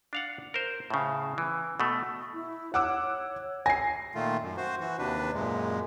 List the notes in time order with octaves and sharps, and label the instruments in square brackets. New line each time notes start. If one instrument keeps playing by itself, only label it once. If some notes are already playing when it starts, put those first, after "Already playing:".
[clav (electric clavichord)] D4 F5 F#5
A#4 C5
A2 C#3
E3
B2 A3
[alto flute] E4
[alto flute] C#5 [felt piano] F#5 D6 E6
[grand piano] G#5 [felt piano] A#6 C7
[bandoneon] A#2 D#3 A3 F4
F#2
F#4 C5
E3 F#4
D#2 C3 D4 B4
F#2 A#2 G#3